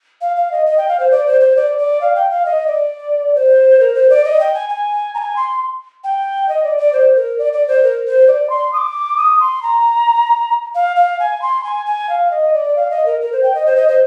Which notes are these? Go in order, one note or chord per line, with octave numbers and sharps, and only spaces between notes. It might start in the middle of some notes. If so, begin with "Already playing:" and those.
F5
F5
D#5
D#5
G5
F5
C5
D5
C5
C5
D5
D5
F5
G5
F5
D#5
D5
C5
A#4
C5
D5
D#5
G5
G#5
G#5
A#5
G#5
C6
G5
D#5
D5
D5
C5
A#4
D5
D5
C5
A#4
C5
D5
C6
D#6
D6
D#6
C6
A#5
F5
F5
G#5
C6
G#5
G#5
F5
D#5
D5
F5
D#5
A#4
A#4
C5
G5
D#5
C5
D#5
C5